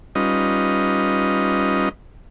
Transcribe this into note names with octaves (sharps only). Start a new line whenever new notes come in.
G3 C#4 D#4 F4 B4 D#5